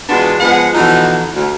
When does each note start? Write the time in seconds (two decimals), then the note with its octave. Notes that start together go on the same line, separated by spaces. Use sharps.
0.09 E2 G#3 B3 D4 F4 F#4
0.40 F3 G#3 B3 F#5
0.73 B2 D3 E3 F3 D#4
1.34 D2